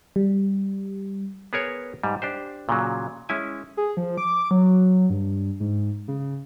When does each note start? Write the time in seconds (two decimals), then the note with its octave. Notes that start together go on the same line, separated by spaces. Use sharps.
0.16 G3
1.53 B3 G#4 A#4 C#5
2.03 G#2 G3
2.22 D4 G4 C5
2.69 A#2 C#3 F#3
3.29 G#3 C#4 E4 G#5
3.77 G#4
3.97 F3
4.18 D6
4.51 F#3
5.10 G2
5.60 G#2
6.08 C#3